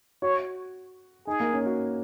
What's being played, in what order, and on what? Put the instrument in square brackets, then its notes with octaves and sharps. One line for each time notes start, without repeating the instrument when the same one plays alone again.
[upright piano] F#4 [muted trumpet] C#5
[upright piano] D#4 [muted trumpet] G#4
[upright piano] A#3
C#4
F#4